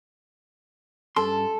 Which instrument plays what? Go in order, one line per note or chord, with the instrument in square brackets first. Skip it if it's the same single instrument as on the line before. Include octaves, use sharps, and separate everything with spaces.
[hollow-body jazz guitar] G2 C#4 C6 [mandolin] A4